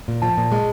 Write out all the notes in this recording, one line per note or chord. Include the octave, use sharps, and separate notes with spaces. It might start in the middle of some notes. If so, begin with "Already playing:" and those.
A#2
F3 A5
A#2
G#3